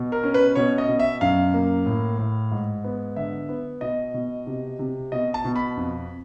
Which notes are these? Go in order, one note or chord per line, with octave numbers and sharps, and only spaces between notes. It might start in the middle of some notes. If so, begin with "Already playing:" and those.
Already playing: B2
A#4
C#4
B4
B2 C#5
D#5
B2
E5
F#2 F5
A#3
A2
A2
G#2
B3
D3 E5
B3
B2 D#5
B2
C3
C3
B2 D#5
A5
B2
B5
F2